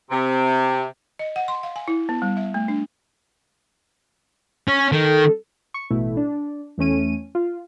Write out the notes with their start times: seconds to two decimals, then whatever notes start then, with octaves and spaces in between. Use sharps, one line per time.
0.11 C3
1.19 D#5
1.36 F#5
1.48 C6
1.63 F5
1.76 G#5
1.88 E4
2.09 B3
2.22 G3
2.37 E5
2.54 A3
2.68 D4
4.68 C#4
4.92 D#3 A4
5.74 C#6
5.90 A1 B2 A3 E4
6.17 D4
6.78 E2 A3 C#4 D#7
7.35 F4